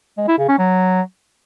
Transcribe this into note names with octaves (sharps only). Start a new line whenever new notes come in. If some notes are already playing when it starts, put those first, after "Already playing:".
G#3
E4
C#3
C#4
F#3